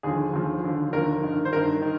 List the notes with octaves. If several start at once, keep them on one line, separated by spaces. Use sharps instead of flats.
D#2 D3 F3 G#4
D#2 D3 F3
D#2 D3 F3
D#2 D3 F3 A#4
G2 D#3
C5
G2 D#3 A#4
D#3